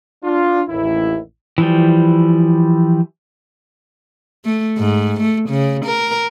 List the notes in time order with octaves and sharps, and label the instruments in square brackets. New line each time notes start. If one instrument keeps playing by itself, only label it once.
[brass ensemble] D4 F4
A1 D#2 E4
[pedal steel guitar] E3 F3 G3
[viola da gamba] A3
G#2
A3
C#3
A#4